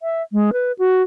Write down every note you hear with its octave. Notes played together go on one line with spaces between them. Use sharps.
E5
G#3
B4
F#4